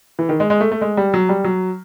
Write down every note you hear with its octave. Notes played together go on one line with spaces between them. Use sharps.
E3
D#3
G#3
G#3
A3
A3
G#3
G3
F#3
G3
F#3